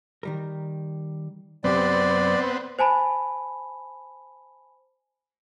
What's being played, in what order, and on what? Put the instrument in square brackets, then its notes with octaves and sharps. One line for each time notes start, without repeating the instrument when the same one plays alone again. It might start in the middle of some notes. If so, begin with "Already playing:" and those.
[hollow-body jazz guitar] D#3 G3 A#4
[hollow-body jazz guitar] F#2 C3 G4 [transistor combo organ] B3 C4 [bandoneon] D5
[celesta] C5 G#5 A5 B5